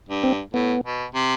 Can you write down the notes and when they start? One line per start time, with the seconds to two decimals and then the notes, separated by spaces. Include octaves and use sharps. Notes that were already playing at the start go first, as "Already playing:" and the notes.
0.09 G2
0.24 C4
0.54 A2 B3
0.84 B2
1.14 C3